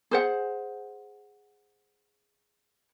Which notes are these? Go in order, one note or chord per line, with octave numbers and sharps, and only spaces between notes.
G#4 C5 F#5